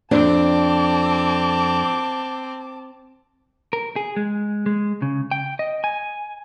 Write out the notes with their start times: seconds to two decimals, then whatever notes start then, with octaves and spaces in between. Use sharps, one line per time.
0.11 F2 C4 D4 A5 D6
3.73 A#4
3.96 G#4
4.16 G#3
4.66 G#3
5.02 C#3
5.31 G5
5.59 D#5
5.84 G#5